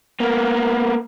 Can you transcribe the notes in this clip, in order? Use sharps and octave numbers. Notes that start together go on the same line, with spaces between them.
A#3 B3